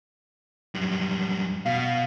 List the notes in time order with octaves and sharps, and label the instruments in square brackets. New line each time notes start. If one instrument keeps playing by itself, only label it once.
[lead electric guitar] F#2 G3
[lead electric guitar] B2 [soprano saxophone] F5